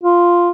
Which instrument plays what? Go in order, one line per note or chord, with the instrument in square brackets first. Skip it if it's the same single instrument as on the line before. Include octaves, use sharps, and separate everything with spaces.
[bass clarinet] F4